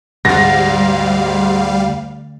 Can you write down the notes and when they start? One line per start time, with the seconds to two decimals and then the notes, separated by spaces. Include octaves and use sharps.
0.25 D2 G#2 G3 F5 F#5 A6 A#6